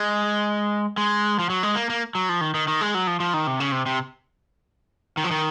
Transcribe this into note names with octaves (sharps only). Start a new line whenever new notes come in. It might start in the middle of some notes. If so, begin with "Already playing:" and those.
Already playing: G#3
G#3
F3
F#3
G#3
A#3
A#3
F#3
F3
D#3
D#3
D#3
G#3
F#3
F3
F3
D#3
C3
C#3
C3
C3
D#3
F3
D#3